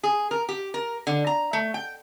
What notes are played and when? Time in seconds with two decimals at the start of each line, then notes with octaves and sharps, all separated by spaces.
0.03 G#4
0.31 A#4
0.49 G4
0.74 A#4
1.07 D3
1.27 A#5
1.53 A3
1.74 G5